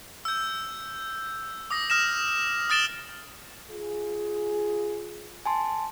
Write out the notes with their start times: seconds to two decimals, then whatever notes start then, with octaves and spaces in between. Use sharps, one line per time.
0.25 E6 G6
1.70 D6 D#6 A#6
1.90 D#6 F6 A#6 E7
2.70 D#6 F6 A6 D7 E7 G7
3.70 F4 G#4
5.46 G#5 A5 C6